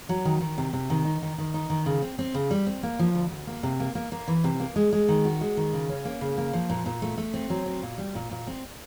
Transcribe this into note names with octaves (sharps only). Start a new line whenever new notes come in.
F#3
D#3
D#3
C3
C3
D#3
D#4
D#3
D#3
D#4
D#3
C#3
C4
C4
C#3
G3
C4
A#3
F3
D2
D2
A#3
C3
A#3
A#3
A#3
E3
C3
A#3
G#3
G#3
D#3
F#4
G#3
D#3
C#3
C#4
A#3
C#3
A#3
F3
A#2
A#2
A3
A3
C4
F#3
C4
A#2
G3
A#2
A#2
C4